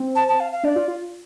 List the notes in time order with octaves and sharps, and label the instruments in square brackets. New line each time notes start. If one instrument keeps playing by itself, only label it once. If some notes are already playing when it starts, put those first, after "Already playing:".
Already playing: [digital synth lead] C4
[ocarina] A5
A5
F5
F5
[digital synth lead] D4 [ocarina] D5
[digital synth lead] F4
F4